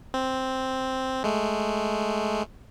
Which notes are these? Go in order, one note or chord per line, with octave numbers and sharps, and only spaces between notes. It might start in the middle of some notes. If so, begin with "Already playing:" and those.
C4
G#3 A3